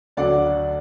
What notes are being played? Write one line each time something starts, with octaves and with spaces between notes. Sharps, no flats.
D2 D3 F#3 D5 F#5